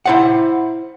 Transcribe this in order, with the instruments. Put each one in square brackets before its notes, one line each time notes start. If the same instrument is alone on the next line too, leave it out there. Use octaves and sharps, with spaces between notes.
[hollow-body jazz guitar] E4 C5 F#5